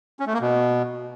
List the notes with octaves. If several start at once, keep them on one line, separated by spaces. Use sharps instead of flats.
C#4
A3
A#3
B2